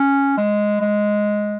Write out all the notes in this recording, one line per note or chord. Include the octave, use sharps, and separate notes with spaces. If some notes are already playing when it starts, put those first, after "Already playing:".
Already playing: C#4
G#3
G#3